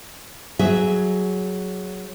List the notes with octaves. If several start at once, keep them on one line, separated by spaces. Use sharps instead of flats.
F#3 G#4 E5